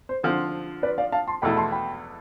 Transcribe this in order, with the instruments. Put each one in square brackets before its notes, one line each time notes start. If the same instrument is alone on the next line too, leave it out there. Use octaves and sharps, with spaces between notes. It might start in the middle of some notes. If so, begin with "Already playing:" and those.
[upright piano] C5
[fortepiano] D3 F3 C4 [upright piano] C5
[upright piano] B4 D5
D5 F5
F5 A5
A5 C6
[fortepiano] E2 B2 A3 E4 [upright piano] G5 B5
[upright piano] A5 C6
G5 B5